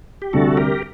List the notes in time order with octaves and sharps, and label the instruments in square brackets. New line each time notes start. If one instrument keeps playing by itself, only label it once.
[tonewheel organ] G4
[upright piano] D2 C3 G3 [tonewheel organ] F#4 A4
[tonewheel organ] G4 A#4